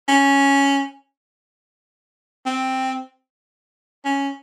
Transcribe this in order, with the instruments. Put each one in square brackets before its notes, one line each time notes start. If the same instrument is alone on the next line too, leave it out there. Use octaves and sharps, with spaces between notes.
[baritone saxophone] C#4
C4
C#4